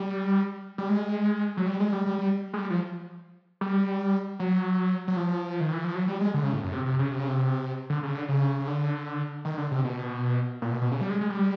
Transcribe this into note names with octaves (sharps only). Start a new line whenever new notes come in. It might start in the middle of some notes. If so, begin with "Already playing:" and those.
Already playing: G3
G3
G#3
F#3
G3
G#3
G3
G3
G3
G#3
G3
F3
G3
F#3
F#3
F3
D#3
E3
F3
F#3
G3
G#3
D3
C#3
A2
F#2
C3
C3
C#3
C3
C#3
C3
D3
C#3
D3
C#3
C#3
D3
D#3
D3
C3
B2
A#2
B2
B2
C#3
G3
G#3
G#3
G3